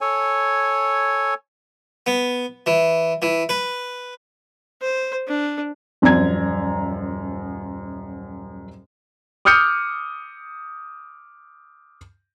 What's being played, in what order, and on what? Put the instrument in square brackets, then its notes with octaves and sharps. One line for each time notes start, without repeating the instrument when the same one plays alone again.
[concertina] A4 C#5 G#5
[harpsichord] B3
E3
E3
B4
[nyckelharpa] C5
D4
[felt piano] D#1 F#2 F3 D5 A#5 G#6
[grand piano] D6 D#6 F6 G6 C#7